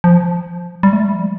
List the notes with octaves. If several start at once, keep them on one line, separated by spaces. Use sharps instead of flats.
F3
G3
A3
G3
F3